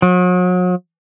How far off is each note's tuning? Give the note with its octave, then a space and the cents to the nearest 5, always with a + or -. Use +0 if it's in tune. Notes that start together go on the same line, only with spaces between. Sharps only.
F#3 -40